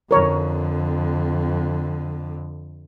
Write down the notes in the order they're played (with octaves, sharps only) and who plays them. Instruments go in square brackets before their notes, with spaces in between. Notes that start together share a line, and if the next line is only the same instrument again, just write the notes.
[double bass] F2 D3 [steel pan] A#4 C#5